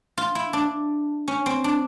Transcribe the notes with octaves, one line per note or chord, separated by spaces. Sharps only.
F4
E4
D4
C#4
C4
D4